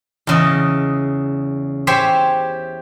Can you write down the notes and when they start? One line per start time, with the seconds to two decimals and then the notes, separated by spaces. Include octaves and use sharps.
0.27 E2 C#3 D#5
1.87 G4 C5 C#5 E5 G#5